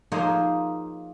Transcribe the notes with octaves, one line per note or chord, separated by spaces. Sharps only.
F3 A#3 D#4 G#4 C5 C#5